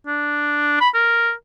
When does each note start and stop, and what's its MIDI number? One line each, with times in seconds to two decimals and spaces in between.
0.07 0.76 62
0.81 0.89 83
0.94 1.32 70